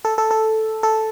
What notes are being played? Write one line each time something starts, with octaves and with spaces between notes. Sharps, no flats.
A4
A4
A4
A4